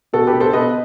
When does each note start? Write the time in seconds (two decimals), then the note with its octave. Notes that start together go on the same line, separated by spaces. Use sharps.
0.13 B2 F#4 A4
0.27 G4 B4
0.33 B2
0.40 A4 C5
0.53 B2 B4 D#5